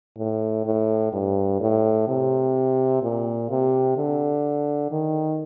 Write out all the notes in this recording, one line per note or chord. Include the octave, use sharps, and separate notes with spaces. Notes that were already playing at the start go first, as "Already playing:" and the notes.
A2
A2
G2
A2
C3
A#2
C3
D3
D#3